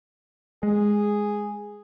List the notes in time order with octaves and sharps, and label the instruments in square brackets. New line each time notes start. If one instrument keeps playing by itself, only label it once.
[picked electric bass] G#3 [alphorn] G#4